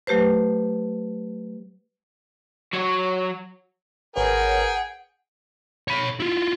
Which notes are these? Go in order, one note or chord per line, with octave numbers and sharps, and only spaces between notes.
F#3 A3 G4 B4 C5
F#3 C#5
G#1 G#4 A#4 B4 C#5 F#5 G5
C#5 B5
E4 F4